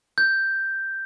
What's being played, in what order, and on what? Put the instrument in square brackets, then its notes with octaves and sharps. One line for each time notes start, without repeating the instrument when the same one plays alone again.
[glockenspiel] G6